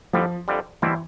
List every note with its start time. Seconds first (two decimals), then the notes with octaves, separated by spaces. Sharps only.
0.13 F2 D3 F3 G3
0.48 F2 D3 G3
0.82 B2 E3 G3 C4 E4